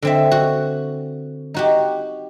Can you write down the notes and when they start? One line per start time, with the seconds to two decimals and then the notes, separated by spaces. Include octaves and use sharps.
0.02 D3 C4 E5
0.31 F#4
1.54 D#4 F#4 G4